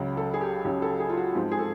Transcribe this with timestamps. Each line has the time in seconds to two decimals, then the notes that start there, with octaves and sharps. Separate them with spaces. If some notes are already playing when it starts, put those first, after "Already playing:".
Already playing: C#2 C#3 F#3
0.17 A4
0.34 G#4
0.41 G4
0.64 C#2 C#3 F#3 G4
0.82 A4
1.00 G#4
1.09 F4
1.17 F#4
1.35 G#2 F3 G#3 C4 G4
1.51 G#4
1.59 A4